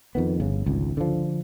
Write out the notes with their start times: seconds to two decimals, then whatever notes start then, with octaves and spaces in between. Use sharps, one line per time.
0.15 F2 D#3 B3
0.40 G1 C#3
0.66 G#1 C#2
0.97 D3 F3